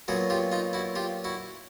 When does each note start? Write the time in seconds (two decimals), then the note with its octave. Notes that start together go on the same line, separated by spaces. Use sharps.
0.08 A#2 F#3 B3 F#4 G#4
0.30 F4 G4
0.52 D#4 F4
0.73 E4 F#4
0.95 F4 G4
1.24 E4 F#4